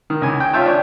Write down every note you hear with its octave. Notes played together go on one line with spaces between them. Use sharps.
D#3
C#2 G#5
G5
C#4 F4 E5 G5 A5
D4 C#5